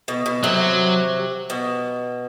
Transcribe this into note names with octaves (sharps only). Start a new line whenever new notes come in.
B2
B2
C3 F#3
B2